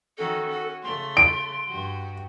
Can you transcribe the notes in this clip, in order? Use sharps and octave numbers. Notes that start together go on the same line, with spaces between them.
D#3 C#4 F#4 A4
C#4 F#4
C#3 A3 C6
D7
G2 F#4 G4